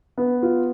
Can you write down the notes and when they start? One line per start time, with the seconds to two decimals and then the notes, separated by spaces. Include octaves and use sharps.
0.18 B3
0.43 F4